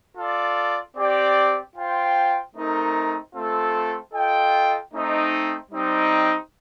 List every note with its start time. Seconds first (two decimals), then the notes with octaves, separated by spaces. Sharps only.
0.16 F4 A4 D5
0.95 C4 G4 D5 G5
1.74 F4 C5 G5
2.54 A3 C4 D#4 A#4
3.33 A3 C4 F4 A4
4.12 F4 A4 D#5 G5
4.93 A3 C4 D#4
5.71 G3 C4 D#4